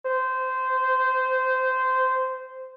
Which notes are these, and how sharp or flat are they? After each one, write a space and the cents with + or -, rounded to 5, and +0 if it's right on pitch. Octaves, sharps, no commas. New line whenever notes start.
C5 -15